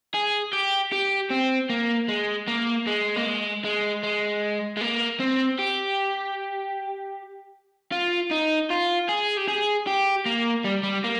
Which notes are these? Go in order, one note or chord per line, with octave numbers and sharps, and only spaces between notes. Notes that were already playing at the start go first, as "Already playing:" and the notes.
G#4
G4
G4
C4
A#3
G#3
A#3
G#3
A#3
G#3
G#3
G#3
G#3
A#3
C4
G4
F4
D#4
F4
G#4
G4
G#4
G4
A#3
G3
G3
A#3